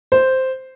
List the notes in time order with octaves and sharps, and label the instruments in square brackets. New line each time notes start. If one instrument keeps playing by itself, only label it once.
[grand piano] C5